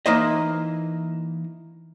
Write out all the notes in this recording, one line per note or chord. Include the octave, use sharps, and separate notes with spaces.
E3 A#3 D#4 E4 C5 D#5